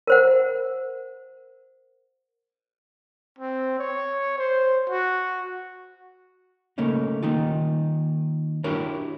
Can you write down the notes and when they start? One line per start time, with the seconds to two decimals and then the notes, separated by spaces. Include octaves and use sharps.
0.07 A#4 C5 F#5
3.39 C4
3.79 C#5
4.38 C5
4.90 F#4
6.78 C#3 A3 A#3 C#4 D#4
7.23 D#3 A#3 D#4 F4
8.64 D4 E4 F#4 G4 A#4 C#5